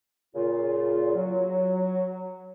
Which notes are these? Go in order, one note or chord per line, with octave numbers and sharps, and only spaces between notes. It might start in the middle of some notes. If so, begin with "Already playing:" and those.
A#2 C#3 F4
F#3